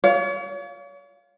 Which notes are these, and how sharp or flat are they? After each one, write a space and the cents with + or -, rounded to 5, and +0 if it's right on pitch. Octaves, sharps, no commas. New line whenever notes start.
C#5 +40 F5 +0